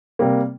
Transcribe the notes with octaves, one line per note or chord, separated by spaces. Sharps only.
C3 G3 A#3